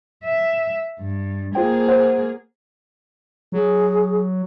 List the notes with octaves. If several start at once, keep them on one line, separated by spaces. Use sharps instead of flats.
E5
G2
A#3 F4 G#4 C5 G5
C5 F#5
F#3 G#4